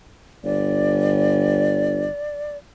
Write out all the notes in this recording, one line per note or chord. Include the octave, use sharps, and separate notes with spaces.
G1 D5